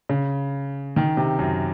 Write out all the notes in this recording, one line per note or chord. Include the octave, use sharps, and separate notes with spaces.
C#3
D#3
C3
F#2